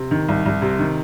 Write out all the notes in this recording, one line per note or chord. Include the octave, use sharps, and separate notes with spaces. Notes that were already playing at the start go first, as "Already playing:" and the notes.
Already playing: C3
D#3
C2
C2
C3
D#3